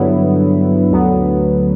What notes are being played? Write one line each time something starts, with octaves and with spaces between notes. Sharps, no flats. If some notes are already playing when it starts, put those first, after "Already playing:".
Already playing: G2 D3 F#3 B3 E4
D2 D3 F#3 B3